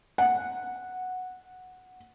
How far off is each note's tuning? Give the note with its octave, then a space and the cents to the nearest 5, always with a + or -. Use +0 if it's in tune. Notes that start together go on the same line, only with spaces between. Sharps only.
F#5 -10